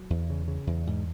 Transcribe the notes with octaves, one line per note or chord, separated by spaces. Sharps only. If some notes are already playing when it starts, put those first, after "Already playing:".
Already playing: F#3
E2
C#3
C#3
E2
G#2